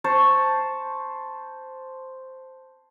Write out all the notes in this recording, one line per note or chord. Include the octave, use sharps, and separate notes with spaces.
C5 A5 C#6